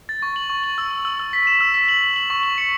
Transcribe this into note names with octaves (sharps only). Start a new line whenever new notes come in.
A6
C#6
F#7
C#6
F#7
E6
E6
E6
E6
B6
E7
E6
B6
F#7
F#7
F#7
C#6
F#7
C#7